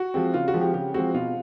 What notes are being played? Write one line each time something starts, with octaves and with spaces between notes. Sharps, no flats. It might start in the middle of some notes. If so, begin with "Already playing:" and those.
Already playing: F#4
F3 G#3 C4
C#3 F4
F#4
F3 G#3 C4
G4
C#3 G4
F3 G#3 C4 F#4
B2 F4